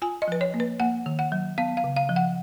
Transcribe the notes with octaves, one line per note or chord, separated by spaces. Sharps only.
F4 G#5
D#5
F3 B4
C#5
A#3
B4
A#3 F#5
D#3
F#5
F#3
B3 F5
F5
C#3
F5
F3
F#5